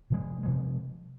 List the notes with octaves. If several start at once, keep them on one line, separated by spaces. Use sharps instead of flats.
C3 F3 G#3
C3 F3 G#3